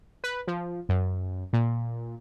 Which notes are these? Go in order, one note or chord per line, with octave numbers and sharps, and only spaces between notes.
B4
F3
F#2
A#2